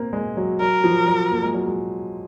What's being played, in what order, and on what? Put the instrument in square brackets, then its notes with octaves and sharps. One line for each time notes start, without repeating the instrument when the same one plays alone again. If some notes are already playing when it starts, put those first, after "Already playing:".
Already playing: [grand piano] A#3 C4
G#3
F#3
[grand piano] F#3 [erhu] A#4
[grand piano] F3
F#3
A#3
G#3
F#3
G#3